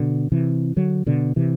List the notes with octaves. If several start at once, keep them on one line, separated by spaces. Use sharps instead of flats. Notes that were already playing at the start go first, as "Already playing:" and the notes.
Already playing: B2 D3
C3 E3
D3 F#3
B2 D3
C3 E3